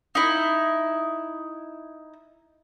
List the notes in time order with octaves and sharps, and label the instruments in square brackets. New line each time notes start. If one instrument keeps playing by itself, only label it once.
[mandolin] D#4 E4